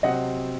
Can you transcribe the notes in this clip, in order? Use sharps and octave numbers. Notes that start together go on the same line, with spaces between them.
C3 F#3 C4 D#5 F#5